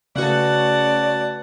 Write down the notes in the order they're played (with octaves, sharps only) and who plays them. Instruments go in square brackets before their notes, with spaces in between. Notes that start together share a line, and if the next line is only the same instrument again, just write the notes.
[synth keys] C#3 F#4 [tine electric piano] A3 B4 [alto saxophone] D5 [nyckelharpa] F#5 A5